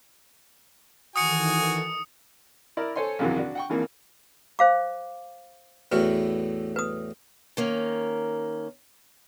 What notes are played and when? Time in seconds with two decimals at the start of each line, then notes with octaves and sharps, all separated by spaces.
1.16 D#3 E3 F#4 A4 G#5 D#6 C#7
2.77 E4 A#4 D5
2.96 A4 C5 C#5 G#5 C6
3.19 A#1 F#2 C3 D#3 E3 F#4
3.37 D4 F#4
3.55 F#5 G5 C#6
3.70 G#1 F2 D#3 E3 A#3
4.59 C5 F5 D6
5.92 E2 A2 F#4 B4
6.76 B4 D#6
7.57 D#3 A#3 C#4